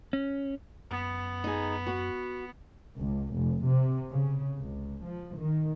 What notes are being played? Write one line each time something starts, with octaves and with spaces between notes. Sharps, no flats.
C#4
F#2 B3
D#4 G#4
F#4
C#2
F1
C3
C#3
C#2
F3
D#3